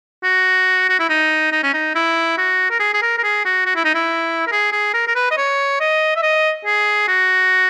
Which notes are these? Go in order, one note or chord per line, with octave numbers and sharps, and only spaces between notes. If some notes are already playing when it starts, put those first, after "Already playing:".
F#4
F#4
E4
D#4
D#4
C#4
D#4
E4
F#4
A#4
G#4
G#4
A#4
A#4
G#4
F#4
F#4
E4
D#4
E4
A#4
G#4
G#4
A#4
A#4
B4
D#5
C#5
D#5
E5
D#5
G#4
F#4